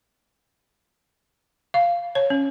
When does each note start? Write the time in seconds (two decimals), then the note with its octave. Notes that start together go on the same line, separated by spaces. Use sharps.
1.74 F5
2.15 C#5
2.30 C#4